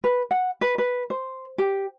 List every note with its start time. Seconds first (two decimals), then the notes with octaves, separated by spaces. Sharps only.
0.04 B4
0.31 F#5
0.61 B4
0.78 B4
1.10 C5
1.58 G4